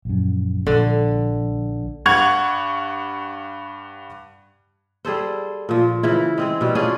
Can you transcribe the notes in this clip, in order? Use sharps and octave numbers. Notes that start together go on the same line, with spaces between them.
A#1 F#2
A#1 D3
G2 F#5 C#6 G#6 F7
G3 G#4 A4 C5
A#2 F3
C#3 E3 E4
G#3 C4 G#4
B2 G3
C#4 D4 F4 G#4